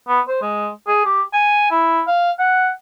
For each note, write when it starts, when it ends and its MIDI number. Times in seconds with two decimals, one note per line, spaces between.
0.08 0.20 59
0.28 0.39 72
0.42 0.69 56
0.88 1.04 68
1.05 1.22 67
1.33 1.66 80
1.71 2.02 64
2.07 2.32 77
2.39 2.70 78